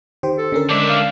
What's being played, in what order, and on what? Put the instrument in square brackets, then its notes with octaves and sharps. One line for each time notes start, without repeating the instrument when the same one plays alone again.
[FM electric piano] D#3 G4 C5
[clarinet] A4
[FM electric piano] D3 C#4 A#4
[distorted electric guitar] G3 E5 [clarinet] G#3 [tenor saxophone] D4
[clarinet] F5